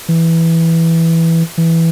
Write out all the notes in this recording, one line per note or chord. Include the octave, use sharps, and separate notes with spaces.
E3
E3